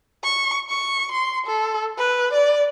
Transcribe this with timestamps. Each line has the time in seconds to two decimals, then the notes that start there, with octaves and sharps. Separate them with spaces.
0.23 C#6
0.70 C#6
1.11 C6
1.46 A4
1.98 B4
2.33 D5